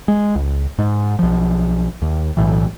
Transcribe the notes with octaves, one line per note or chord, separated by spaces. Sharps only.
G#3
C#2
G#2
B1 F3
D#2
B1 A2 E3